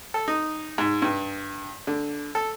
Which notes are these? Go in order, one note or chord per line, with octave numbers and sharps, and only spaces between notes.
A4
D#4
G#2
G2
D3
A4